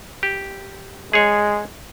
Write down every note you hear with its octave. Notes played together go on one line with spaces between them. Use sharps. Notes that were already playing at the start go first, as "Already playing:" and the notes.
G4
G#3 G#4 C#5